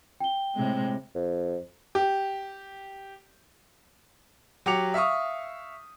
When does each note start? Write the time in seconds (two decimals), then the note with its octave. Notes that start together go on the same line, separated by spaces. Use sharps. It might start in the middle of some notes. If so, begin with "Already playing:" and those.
0.20 G5 G7
0.55 A2 C3 G#3
1.15 F2
1.95 G4
4.66 F#3 G4 D6 C#7 F7
4.94 E5 F5 C#6 D#6